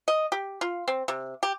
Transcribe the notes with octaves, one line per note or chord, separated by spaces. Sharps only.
D#5
G4
F4
C4
C3
G4